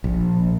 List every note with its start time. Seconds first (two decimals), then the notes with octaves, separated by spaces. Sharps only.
0.04 A#1